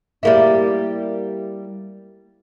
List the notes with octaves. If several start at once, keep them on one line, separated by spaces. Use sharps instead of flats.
G3 A#3 E4